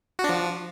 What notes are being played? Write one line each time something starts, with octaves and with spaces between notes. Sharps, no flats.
F#4
D4
F3